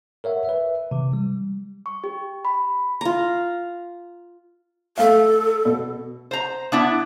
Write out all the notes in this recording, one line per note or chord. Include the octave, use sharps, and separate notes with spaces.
A#4 C#5 E5 F#5
B4 E5
C3 E3
G3
C#6
G4
B5
F4 A#5
A3 A4 F5
B2
C5 A#5
B3 D4 E4